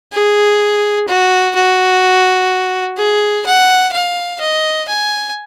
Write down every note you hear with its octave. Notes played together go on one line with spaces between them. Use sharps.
G#4
F#4
F#4
G#4
F#5
F5
D#5
G#5